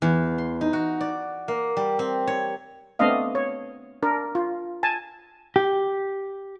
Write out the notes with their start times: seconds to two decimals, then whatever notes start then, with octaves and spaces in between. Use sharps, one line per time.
0.02 E2
0.38 C6
0.61 D#4
0.73 F#4
1.01 D5
1.48 A#3
1.77 G3
1.99 C4
2.27 C#5
2.99 A3 B3 C4 D4 D#5 F5
3.35 C#5
4.03 D4 A#4
4.35 F4
4.83 G#5 A5
5.56 G4